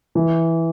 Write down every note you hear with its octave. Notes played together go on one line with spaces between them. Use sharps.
E3